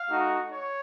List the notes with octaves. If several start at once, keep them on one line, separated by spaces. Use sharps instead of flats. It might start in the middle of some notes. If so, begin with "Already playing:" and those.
Already playing: F5
A3 D#4 F#4
C#5